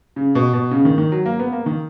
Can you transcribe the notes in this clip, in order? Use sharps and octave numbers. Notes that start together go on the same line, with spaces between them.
C#3
B2
B2
C#3
D#3
D#3
F#3
A#3
B3
A#3
D#3